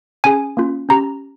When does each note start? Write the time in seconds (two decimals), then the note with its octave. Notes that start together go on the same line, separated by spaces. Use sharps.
0.24 C#4 G#4 G#5
0.57 A#3 C#4 F4
0.89 C#4 G4 A#5